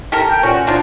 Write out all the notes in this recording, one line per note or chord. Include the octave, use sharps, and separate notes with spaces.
G4 A4 A#4
G5
A#2 C#4 F#4
F3 D4 D#4 F4 C5